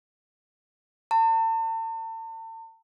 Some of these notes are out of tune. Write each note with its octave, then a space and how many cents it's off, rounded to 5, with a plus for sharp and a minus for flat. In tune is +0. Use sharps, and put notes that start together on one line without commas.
A5 +40 C#6 -15